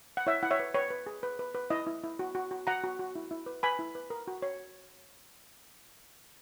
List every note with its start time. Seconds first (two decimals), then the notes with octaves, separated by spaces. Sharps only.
0.17 F#5
0.27 E4 C#5 E5
0.43 E4 F#5
0.51 C#5 E5
0.60 B4
0.75 B4 C#5
0.91 B4
1.07 G#4
1.23 B4
1.39 B4
1.54 B4
1.70 E4 D#5
1.86 E4
2.04 E4
2.19 F#4
2.35 F#4
2.51 F#4
2.67 F#4 F#5 A#5
2.84 F#4
2.99 F#4
3.15 E4
3.31 E4
3.46 B4
3.63 B4 G#5 B5
3.79 E4
3.95 B4
4.10 A#4
4.28 F#4
4.42 C#5